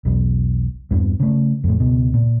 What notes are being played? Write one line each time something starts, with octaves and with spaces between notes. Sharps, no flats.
E1 B1
E2 G2
C#3 A3
F2 A2
C#2 B2
A#2